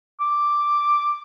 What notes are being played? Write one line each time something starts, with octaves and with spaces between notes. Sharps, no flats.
D6